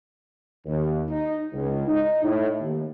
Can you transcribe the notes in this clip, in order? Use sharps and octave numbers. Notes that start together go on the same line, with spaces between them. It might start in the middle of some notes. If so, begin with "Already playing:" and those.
D#2
D#4
C#2
D#4
A2
D#2